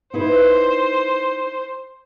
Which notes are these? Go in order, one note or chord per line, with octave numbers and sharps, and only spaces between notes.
D#4 E4 B4 C5